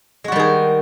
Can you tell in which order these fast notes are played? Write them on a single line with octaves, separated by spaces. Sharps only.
G#3 F#4 G3 D#3 G#4